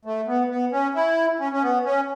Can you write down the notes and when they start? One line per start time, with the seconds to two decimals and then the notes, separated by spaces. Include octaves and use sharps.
0.05 A3
0.27 B3
0.49 B3
0.72 C#4
0.95 E4
1.40 C#4
1.52 C#4
1.63 B3
1.85 C#4